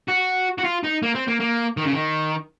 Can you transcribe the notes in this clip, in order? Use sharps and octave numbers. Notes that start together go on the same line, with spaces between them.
F#4
F#4
F4
D#4
A#3
C4
A#3
A#3
D#3
C#3
D#3